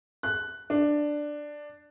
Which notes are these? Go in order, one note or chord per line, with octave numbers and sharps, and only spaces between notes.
F#6
D4